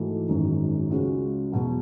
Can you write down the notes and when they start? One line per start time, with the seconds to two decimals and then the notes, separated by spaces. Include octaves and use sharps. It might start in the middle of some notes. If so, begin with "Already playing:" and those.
Already playing: G#2 E3 A3 D#4 F#4
0.27 G#1 F#2 D#3
0.90 C#2 C#3 G#3 C#4 F#4
1.52 E2 B2 F#3